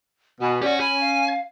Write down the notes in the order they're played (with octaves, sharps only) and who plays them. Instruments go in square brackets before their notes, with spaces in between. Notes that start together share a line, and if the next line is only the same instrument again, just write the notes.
[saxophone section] B2 [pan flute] G#5
[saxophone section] C#4 [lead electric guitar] G4 F#5 [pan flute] D5
[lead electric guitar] G#5 [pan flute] B5
[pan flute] F5